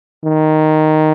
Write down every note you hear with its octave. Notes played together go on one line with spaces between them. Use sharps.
D#3